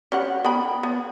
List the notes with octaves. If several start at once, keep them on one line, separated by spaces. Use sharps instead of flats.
C#4 G4 F#5
B3 G5 B5
B3